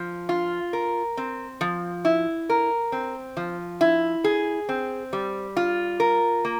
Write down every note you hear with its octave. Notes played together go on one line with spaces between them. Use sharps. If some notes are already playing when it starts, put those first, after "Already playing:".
Already playing: F3
F4
A#4
C4
F3
E4
A#4
C4
F3
E4
G#4
C4
G3
F4
A#4
A#3